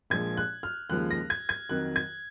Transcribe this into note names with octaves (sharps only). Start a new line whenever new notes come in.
A#1 A#2 F3 G#3 G#6
F#6
F6
D#2 C#3 F3 G#3 F#6
A#6
G#6
G#6
F2 D#3 F#3 F#6
G#6